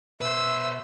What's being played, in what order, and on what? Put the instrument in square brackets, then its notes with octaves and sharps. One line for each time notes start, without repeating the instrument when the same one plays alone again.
[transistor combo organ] B2 [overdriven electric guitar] B4 C5 [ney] E5 [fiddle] E6